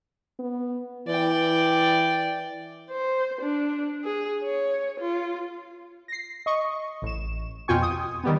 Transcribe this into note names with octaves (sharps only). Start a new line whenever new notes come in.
B3
E3 D5 G5
C5
D4
G#4
C#5
F4
A#6 C7
D#5 C#6
A1 E7
F2 B2 F4 G5 G#5 C#6
D#6
D#3 G3 B3